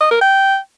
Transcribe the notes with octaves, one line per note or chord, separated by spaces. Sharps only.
D#5
A#4
G5